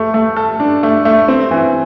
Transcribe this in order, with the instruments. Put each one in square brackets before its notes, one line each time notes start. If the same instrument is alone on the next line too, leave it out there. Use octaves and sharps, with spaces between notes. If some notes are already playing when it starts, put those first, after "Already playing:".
Already playing: [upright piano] A3
A3
A4
D4
A3
A3
C4
E3